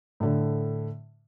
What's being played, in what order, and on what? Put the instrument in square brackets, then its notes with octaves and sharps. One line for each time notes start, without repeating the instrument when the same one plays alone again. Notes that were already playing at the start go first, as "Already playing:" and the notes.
[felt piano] A2 D3